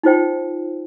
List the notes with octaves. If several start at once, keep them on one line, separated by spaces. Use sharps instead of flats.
D#4 F4 C5 G5